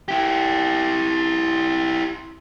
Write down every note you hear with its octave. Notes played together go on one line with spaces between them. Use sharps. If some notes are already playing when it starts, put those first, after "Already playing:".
E4 G4